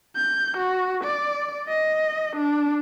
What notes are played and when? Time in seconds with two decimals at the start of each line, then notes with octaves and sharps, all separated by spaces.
0.16 G6
0.57 F#4
1.04 D5
1.68 D#5
2.36 D4